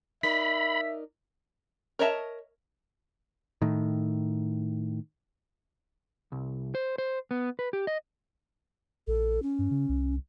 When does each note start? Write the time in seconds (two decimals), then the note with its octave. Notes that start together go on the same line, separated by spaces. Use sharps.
0.23 D#4 A#4 D5 E5 B5 B6
1.99 A#4 C#5 D#5 E5 A5
3.62 A2 D#3
6.32 C2
6.75 C5
6.98 C5
7.31 B3
7.59 B4
7.73 G4
7.87 D#5
9.07 A#1 A4
9.42 C#4
9.59 G2
9.71 C#3
9.89 C2